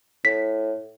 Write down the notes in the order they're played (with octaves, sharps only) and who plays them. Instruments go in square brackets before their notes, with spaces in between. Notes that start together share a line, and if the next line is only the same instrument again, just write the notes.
[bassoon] A2 [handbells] B6